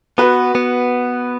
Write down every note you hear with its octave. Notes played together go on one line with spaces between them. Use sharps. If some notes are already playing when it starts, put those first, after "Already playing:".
B3 F#4 B4
B3